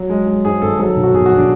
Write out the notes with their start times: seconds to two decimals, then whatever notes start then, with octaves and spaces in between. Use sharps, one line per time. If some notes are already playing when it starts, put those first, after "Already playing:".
Already playing: F#3
0.10 G#3
0.27 G#3
0.45 G#2 G#4
0.62 G#1 A4
0.79 F#3 A4
0.97 B1
1.03 F#4
1.14 B2 G#4
1.26 F#4
1.31 B2
1.37 D4